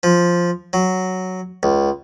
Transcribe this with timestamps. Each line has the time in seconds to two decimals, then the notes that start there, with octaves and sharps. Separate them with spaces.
0.03 F3
0.73 F#3
1.63 C#2